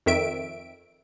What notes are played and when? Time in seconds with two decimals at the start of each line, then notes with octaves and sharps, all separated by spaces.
0.06 F2 D#3 E5 D7